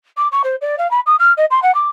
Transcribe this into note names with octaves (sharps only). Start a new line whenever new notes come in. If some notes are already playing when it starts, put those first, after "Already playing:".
D6
C#6
C5
D5
F5
B5
D#6
F6
D#5
C6
F#5
D6